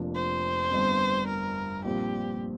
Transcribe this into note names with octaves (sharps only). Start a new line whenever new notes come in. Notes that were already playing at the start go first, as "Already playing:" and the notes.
Already playing: F1 F2 F3 A#3 D4
C5
G1 G2 G3 C4
A#4
A#1 A#2 G3 C4 G4